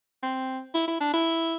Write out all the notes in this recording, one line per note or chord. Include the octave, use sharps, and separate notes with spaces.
C4
E4
E4
D4
E4